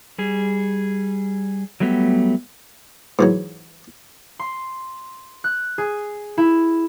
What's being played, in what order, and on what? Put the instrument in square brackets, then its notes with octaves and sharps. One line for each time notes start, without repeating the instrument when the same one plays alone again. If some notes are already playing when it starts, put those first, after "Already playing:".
[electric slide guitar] G3 G#4
F#3 G3 A3 B3 E4 G4
[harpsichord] G#2 E3 F#3
[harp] C6
F#6
G#4
E4